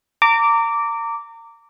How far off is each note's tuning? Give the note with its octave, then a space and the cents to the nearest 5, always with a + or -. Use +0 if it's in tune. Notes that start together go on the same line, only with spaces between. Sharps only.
A#5 -30 D6 -10